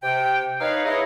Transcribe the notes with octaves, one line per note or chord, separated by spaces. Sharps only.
C3 G5
D#4 B4 C#5 F5
E4 G#4 C#5 D#5